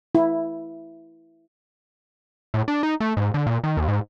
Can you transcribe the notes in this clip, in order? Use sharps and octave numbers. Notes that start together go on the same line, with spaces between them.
E4
A2
D4
D#4
A3
G#2
D3
A#2
D#3
D#2
G#2